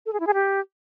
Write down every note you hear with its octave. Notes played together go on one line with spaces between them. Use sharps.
A4
G#4
E4
G#4
G4